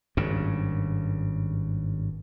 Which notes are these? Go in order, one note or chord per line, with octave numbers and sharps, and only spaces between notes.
G#1 G2 C#3